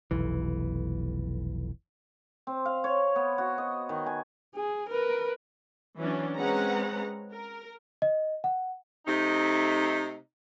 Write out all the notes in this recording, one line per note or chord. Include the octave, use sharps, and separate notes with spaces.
F1 B1 E3
C4
F5
C#5
B3
F#4
D#5
D#3
G#5
G#4
A#4 B4
E3 F#3 C#4 D4
G#3 C4 C#4 B4 F#5 A#5
A#4
D#5
F#5
C3 A3 D#4